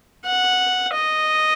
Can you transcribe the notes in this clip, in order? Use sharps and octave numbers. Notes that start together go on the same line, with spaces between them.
F#5
D#5